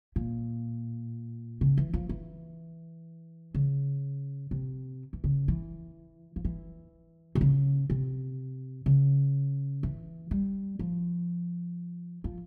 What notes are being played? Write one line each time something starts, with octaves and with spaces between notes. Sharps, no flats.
A#2
C#3
E3
F3
E3
C#3
C3
E3
C#3
E3
F3
E3
C3
C#3
C3
C#3
E3
G3
F3
F3